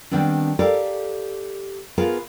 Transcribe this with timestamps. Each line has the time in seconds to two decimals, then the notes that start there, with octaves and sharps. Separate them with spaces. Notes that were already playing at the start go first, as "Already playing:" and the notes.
0.11 D#3 G3 B3 C4 D4
0.59 G4 A4 A#4 D5 F5
1.98 B3 F4 G#4 A#4 B4 F5